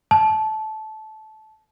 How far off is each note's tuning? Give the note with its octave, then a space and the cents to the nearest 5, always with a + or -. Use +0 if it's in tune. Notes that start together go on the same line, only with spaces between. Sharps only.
A5 -20